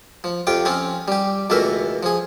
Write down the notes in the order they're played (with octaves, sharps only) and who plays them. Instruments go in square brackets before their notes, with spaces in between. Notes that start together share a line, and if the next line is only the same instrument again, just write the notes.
[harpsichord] F3
F2 C3 F4 G5 D6
F3 C4 C#4 F4
G3 G4
C#2 B2 E3 A3 A#4 E5
F3 G#4